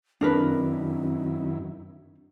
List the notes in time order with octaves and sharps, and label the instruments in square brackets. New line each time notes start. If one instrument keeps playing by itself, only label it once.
[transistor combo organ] F#2 D#3 E4 [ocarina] C4 [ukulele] D4 A#4 B4